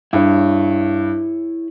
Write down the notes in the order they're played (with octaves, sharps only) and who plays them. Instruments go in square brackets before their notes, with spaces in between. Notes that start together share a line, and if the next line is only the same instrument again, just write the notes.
[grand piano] G2 [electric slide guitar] E4 G#4 C#5